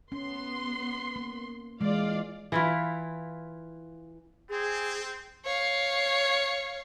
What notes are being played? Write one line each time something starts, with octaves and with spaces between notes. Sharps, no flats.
B3 C#4 C6
A#3
E3 G#3 F4 D5 F5
E3 E4 F4
C4 G#4
C#5 F5